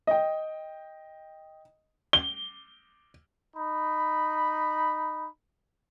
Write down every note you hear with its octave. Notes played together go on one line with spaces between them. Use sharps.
D#5 G5
G7
D#4 B5